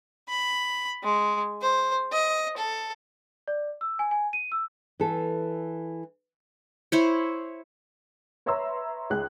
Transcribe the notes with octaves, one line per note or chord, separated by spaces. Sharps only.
B5
G#3
C5
D#5
A4
D5
E6
G#5
G#5
D#7
E6
E3 A4
E4 C5 C#5
B4 C#5 E5 A#5 C6 E6
C#2 G#4 F#6